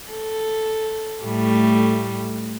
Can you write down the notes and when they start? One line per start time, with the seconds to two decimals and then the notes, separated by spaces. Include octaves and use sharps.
0.11 A4
1.23 A2 G3 A3